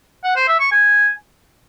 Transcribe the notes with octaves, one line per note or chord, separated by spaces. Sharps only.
F#5
C5
E5
C#6
G#5